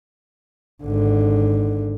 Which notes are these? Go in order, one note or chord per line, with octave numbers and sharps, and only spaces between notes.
G#1 D3